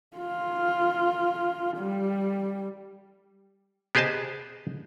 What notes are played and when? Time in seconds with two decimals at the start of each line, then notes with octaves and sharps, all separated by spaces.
0.17 F4
1.78 G3
3.95 B3 G4 G#4 C5 D#5 A5